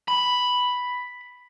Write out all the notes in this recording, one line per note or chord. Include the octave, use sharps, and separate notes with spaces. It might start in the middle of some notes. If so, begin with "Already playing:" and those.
B5